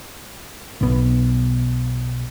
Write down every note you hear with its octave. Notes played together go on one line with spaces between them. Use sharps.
B1 B2